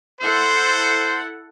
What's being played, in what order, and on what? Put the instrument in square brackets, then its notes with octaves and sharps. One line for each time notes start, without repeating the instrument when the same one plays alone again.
[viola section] E4 A4 F#5 [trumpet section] C5